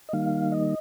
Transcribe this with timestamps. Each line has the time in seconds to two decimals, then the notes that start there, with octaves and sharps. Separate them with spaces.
0.09 D#5
0.13 D#3 G3 A#3 D#4 F5
0.52 D#5